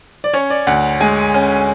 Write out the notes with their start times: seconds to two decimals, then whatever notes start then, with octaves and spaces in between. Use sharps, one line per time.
0.24 D5
0.34 C#4 C#5
0.50 D5
0.67 D2 F#5
1.00 G#3 G#5
1.34 C#4